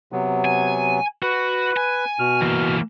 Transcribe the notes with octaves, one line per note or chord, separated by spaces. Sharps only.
C3 F#3 B3
G#5
F#4 B4
G#5
B2 F6
E3 A#3